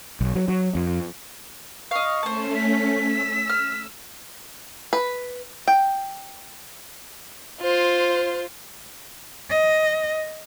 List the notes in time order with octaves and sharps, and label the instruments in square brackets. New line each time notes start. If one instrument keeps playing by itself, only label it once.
[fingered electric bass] B1
F#3
F#3
F2
[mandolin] D#5 F5 [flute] C#6
[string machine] A3 C#4 [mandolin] C5 A5
[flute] B6
[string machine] E6
[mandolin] F6
[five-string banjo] B4
G5
[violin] F4 C5
[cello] D#5